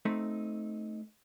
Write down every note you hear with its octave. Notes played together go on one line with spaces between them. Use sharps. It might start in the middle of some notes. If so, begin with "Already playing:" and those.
A3 C4 D#4